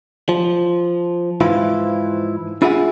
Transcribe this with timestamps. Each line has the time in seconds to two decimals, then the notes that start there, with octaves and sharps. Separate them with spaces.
0.29 F3
1.41 G#2 E3 F3 E4 F4
2.62 D4 E4 F4 G#4 E5 F#5